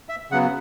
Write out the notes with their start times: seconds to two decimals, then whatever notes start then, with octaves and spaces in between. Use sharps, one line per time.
0.09 E5
0.31 C#3 F#3 B3 F#5